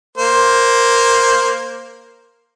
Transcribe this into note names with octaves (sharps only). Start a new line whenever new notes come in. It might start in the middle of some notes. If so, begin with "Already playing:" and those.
A#3 C5